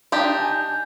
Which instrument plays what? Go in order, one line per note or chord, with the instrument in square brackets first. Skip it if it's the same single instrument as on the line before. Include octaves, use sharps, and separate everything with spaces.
[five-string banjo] D4 D#4 G4
[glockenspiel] G#5 G6